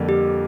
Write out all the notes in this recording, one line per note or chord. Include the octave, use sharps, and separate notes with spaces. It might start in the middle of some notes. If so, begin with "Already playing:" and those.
Already playing: F2 D3 G3 A#3
G4